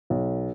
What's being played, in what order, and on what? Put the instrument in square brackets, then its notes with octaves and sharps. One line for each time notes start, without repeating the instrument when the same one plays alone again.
[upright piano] B1